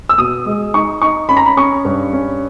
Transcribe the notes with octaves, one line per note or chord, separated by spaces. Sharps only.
E6
B2 D#6
G#3
D#4 C#6
D#4 C#6
C#4 B5
A#5
B5
C#4 C#6
G2
C#4